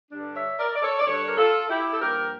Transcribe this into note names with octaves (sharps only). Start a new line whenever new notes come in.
G2 D3 G3 D4
C#5 E5
A#4 D5
D5
A4 C#5
D5
G2 D3 G3 D4 A4 C#5
A#4
F4 A4
E4 G4
A4
G2 F3 A#3 D4 G4 A#4